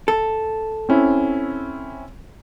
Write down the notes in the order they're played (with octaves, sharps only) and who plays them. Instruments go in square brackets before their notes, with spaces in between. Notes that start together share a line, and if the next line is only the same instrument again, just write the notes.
[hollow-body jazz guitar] A4
[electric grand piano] C4 C#4 E4